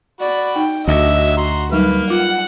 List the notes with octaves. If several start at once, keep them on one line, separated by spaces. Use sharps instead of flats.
F#4 D5 B5
D#4 G5
D2 F#3 D#5 E5
F#4 A#5 C6
F#3 G3 A#3 D#4 B4 F6
F4 F#5